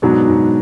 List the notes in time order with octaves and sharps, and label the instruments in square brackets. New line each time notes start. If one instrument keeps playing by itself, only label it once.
[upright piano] G#2 [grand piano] B2 F#3 B3 D4 F#4
[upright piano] G#2